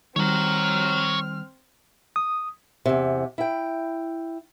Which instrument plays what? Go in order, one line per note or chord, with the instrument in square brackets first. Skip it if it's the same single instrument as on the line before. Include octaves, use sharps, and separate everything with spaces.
[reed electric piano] D#3 G3 [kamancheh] C4 F6 [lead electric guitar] C#5 A#5
[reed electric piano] D#6
[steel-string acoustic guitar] E2 C3
E4 G5